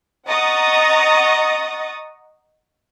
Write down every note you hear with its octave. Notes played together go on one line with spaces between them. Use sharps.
D#5 F#5 A#5 C#6 D#6 A6